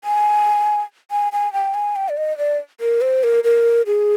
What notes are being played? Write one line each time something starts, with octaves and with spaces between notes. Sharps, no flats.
G#5
G#5
G#5
G5
G#5
G5
D5
D#5
D5
A#4
C5
A#4
A#4
G#4